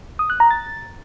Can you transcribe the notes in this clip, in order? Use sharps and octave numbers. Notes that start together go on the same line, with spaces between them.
D#6
F#6
A#5
A6